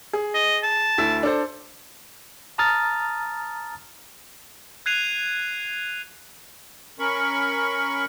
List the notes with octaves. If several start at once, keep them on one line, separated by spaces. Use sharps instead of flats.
G#4
D#5
A5
D2 E4 E5
D4 A4 C5
A5 A#5 D#6 F6 A6
F#6 G#6 C7 D#7 F7
C#4 A#4 B5 C#6